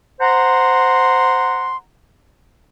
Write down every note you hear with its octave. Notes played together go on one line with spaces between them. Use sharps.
C5 F#5 A#5 C6